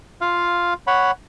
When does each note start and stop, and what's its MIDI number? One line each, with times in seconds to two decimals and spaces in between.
0.21 0.74 65
0.21 0.74 77
0.87 1.11 73
0.87 1.11 78
0.87 1.11 83